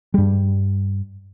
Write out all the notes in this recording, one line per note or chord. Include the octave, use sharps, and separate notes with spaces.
G2 G3